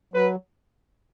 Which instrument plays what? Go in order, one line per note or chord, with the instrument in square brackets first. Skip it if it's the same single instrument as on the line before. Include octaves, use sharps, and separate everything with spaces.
[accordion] F#3 [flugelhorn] B4